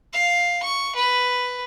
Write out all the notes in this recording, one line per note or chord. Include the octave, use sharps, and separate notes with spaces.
F5
C#6
B4